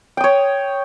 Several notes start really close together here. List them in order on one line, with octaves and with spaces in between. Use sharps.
G5 D#6 C#5